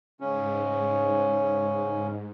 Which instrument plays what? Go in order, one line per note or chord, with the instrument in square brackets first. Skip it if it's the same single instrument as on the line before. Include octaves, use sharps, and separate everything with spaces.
[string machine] G#2 [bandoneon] C#3 C#4